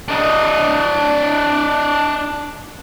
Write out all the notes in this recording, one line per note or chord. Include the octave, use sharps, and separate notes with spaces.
D4 D#5